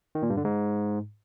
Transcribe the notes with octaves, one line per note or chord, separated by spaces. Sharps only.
D#3
A#2
G2
D3
G#2